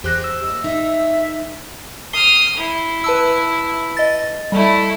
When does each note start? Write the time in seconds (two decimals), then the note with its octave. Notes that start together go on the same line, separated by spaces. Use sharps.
0.04 E2 G4 G#4 C5 F#6 A#6
0.24 E6
0.43 A#3 D#5
0.64 D#4 E5
2.13 D#6 F6 C7 G7
2.57 E4
3.04 B4 A5 E6
3.97 D#5 A6
4.52 G3 A3 E4